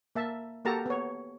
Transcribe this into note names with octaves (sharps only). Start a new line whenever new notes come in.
A#3 E5 A5
A#3 F#4 G4 A4 A5 A#5
B3 C#5